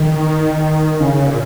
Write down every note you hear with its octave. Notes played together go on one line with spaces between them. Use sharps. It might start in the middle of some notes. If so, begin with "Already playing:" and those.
Already playing: D#3
C#3
A#2